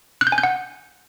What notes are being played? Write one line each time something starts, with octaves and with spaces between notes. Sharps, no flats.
F#6
G6
G#5
G6
F#5